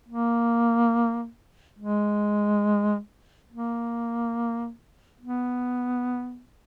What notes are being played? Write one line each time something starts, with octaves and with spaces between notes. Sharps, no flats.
A#3
G#3
A#3
B3